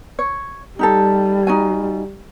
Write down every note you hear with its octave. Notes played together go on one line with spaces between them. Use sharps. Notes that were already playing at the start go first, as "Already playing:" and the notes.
C#5
G3 D#4 G4 A4
D#4 F#4 G#5